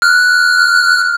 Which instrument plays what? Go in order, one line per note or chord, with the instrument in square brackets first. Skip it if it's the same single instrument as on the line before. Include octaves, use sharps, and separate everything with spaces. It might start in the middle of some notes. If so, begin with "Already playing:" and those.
[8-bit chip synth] F6 F#6